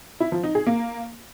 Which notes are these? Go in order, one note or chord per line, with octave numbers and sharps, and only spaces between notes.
E4
F3
D#4
G#4
A#3